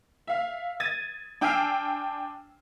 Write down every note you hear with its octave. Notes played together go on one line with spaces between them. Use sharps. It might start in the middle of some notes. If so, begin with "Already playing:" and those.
E5 F5
G#6 A6 D#7
D4 G5 G#5 E6 F6 C7